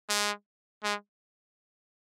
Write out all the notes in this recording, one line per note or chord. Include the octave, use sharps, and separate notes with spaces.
G#3
G#3